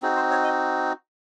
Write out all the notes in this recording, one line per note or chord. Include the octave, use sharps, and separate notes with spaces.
C4 D#4 F#4 G#4
C5
C#5
D#5